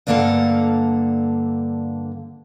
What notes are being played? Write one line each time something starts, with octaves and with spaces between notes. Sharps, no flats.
G2 D3 A#3 A4 F5 F#5